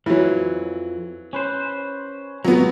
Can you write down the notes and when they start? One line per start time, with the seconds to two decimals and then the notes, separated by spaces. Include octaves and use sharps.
0.06 F2 G#2 E3 F#3
1.33 C#4 B4 C5
2.45 D#2 G#2 F#3 B3